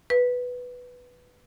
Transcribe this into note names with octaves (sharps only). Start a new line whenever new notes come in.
B4